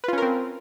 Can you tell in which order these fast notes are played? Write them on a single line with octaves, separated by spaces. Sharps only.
B4 F4 C#4 A#4 C4